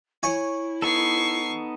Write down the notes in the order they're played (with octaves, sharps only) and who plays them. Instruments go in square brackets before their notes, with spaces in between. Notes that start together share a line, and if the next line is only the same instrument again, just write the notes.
[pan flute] E4 [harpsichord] C#5 G#5
[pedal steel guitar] B3 D#4 A4 [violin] C#6 C7